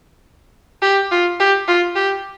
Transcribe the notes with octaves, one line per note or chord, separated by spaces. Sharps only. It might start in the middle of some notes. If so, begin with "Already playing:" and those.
G4
F4
G4
F4
G4